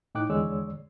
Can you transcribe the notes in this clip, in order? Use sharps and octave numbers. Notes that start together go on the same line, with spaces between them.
A2 D#4 G5 D6 F#6
E2 D3 G#3 C#5 D5 E6